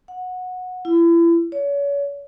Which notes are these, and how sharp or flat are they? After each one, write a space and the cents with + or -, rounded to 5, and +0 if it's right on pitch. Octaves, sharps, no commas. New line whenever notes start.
F#5 -15
E4 +35
C#5 +35